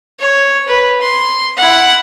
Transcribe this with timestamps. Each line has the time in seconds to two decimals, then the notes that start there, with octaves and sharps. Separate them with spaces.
0.20 C#5
0.68 B4
1.02 C6
1.57 E4 F#5